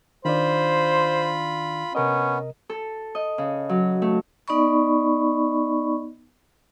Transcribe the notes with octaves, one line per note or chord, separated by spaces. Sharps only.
D#3 D4 F4 C5 D5 B5
C3 B3 C#4 A#4 D#5
A4
D#5
C#3
F#3
A3
B3 D#4 D5 D#5 B5 C#6